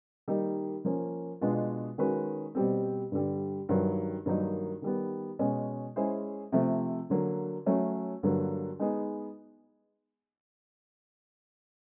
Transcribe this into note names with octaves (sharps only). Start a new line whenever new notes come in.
D#3 G3 A#3 D#4
F3 A#3 C#4
B2 G#3 B3 D4 F4
D#3 G#3 C#4 F#4 B4
B2 G3 C4
G2 D3 G3
G2 D#3 F#3
G2 D#3 F#3 A#3 D#4
D#3 G3 B3
B2 G#3 C#4
G#3 C#4 E4 G#4 C5
C3 F3 A3
D3 F#3 A#3
F#3 A3 C#4
G2 D3 F#3 A#3
G#3 B3 D#4 G#4